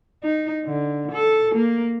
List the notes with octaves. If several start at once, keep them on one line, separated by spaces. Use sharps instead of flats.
D#4
D3
A4
A#3